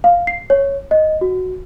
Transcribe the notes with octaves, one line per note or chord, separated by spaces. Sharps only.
F5
C7
C#5
D#5
F#4